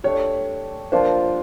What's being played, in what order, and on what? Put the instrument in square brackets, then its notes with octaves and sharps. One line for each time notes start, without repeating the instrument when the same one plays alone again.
[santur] A3 D4 G4 [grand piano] C#5
[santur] F3 A#3 D4 F4 [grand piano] C5